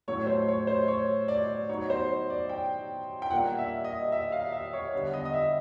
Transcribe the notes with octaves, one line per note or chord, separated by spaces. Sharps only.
A2 F#3 A3 C#4 C#5
C5
C#5
C5
C#5
D5
F#3 B3 D#4 C#5
C5
D5
G5
G5
A#2 G3 A#3 D4 F#5
E5
D#5
E5
F5
E5
C#5
D3 G3 B3 D4
D#5
D#5
E5